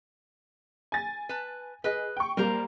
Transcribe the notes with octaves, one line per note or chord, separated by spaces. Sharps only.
G#5 A6
B4 A5
G#4 B4 D#5
G5 C#6
G3 A#3 A#4 C5 A#5